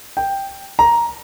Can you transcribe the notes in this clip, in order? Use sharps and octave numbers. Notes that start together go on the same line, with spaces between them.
G5
A#5